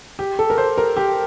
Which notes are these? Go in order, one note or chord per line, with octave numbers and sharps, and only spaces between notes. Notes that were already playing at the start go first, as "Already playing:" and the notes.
G4
A4
A#4
C5
A#4
G4